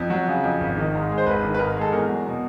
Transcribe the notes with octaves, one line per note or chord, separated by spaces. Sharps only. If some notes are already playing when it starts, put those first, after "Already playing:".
Already playing: F2
F#3
C#3
F2
G#1
D#3
G#2
G#3
C5
G#1 B4
D#3
B4
G#2 A#4
G#3
A4
E2 A#4
F#3
B2